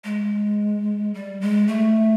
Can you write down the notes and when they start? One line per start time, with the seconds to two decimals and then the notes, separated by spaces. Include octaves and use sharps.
0.04 G#3
1.14 G3
1.41 G#3
1.68 A3